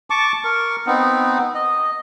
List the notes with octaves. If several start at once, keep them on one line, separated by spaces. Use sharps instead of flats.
A5 C#6 D6
A#4 C#6
B3 C4 D#4
D#5